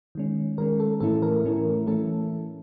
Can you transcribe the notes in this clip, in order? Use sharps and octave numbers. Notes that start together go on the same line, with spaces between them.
D#3 G#3 C#4
D#3 G#3 C#4 A#4
A4
A2 E3 A3 C#4 E4 A4
A#4
A2 E3 A3 C#4 E4
E3 A3 C#4 E4 A4